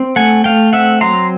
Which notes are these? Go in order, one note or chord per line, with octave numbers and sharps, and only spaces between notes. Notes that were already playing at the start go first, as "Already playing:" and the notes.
Already playing: C4
A3 F#5 G#5
A3 F5 G5
C4 E5 F#5
F#3 A#5 C6